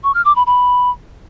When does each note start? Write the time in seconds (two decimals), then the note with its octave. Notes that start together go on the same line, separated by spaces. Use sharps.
0.04 C#6
0.14 F6
0.25 D6
0.36 B5
0.46 B5